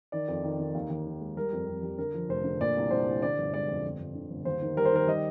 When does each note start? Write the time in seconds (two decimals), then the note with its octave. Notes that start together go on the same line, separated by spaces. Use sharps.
0.12 D#3 D5
0.28 F2
0.44 D#3
0.60 D#3
0.74 D#2
0.90 D#2
1.06 D#3
1.21 G#3
1.37 G3 A#4
1.53 F2
1.67 F2
1.83 G3
1.98 D3 A#4
2.14 F3
2.29 F1 C5
2.44 D3
2.61 A#2 D5
2.76 C2
2.91 C2 C5
3.06 C2
3.22 D3 D5
3.38 G1
3.53 G#3 D5
3.68 F2
3.84 G1
4.00 G1
4.15 D3
4.30 G1
4.45 D#2 C5
4.62 D#3
4.77 G3 A#4
4.85 C5
4.92 D#3 A#4
5.07 G3 D#5